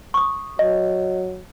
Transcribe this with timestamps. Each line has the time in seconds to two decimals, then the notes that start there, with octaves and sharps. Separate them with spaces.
0.14 C#6 D#6
0.59 F#3 D#5